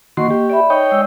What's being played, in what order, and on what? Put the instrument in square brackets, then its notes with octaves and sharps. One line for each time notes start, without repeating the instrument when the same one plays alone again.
[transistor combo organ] D#3 F#4 C6 [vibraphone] A#3 D#5 C#6
[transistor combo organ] G4
[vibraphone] D5 E5 B5
[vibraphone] D#4 [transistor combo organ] C#5 D#5 G5
[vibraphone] G#3 D5 E6